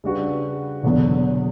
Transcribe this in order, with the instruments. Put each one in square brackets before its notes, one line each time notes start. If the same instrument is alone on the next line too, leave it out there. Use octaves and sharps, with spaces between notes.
[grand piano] C#3 G3 D4 F#4 B4
E1 E2 D3 F#3 B3